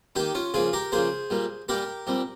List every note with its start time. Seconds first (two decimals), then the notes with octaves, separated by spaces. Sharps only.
0.15 D#3 A#3 D#4 G4
0.35 C#4 F4
0.54 C#3 F3 A#3 F4 G#4
0.73 G4 A#4
0.92 C#3 F3 A#3 G#4 C5
1.30 A#2 G3 A#3
1.69 A#2 G3 A#3 G4 A#4
2.07 A#2 G3 C4